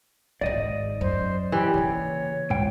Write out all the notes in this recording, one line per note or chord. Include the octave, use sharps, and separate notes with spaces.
G#1 G#2 D5 D#5
F#2 C5
E3 G4
C#3 A#3 C#5
C#2 G#2 G5